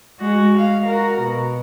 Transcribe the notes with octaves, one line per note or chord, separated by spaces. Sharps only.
G#3 F#4
F5
F#4 A#4
B2